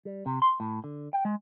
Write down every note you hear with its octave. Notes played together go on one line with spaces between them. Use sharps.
G3
C3
C6
A2
D3
G5
G#3